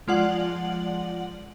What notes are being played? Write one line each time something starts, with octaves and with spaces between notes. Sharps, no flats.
F3 G#3 F4 D5 F#5 F#7